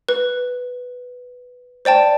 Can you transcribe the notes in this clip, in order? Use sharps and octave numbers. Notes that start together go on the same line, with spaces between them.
B4
C5 D5 G5 A5